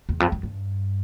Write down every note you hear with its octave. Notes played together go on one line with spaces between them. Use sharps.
E2
F2
F#2
G2